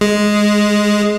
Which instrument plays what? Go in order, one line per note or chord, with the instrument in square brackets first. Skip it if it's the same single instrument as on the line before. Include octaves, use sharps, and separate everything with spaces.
[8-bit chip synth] G#3